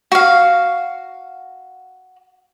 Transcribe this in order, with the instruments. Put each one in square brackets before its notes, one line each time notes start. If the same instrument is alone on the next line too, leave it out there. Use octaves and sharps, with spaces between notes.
[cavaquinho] F#4 F5